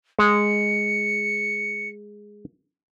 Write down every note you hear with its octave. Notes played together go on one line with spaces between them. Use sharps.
G#3 C#7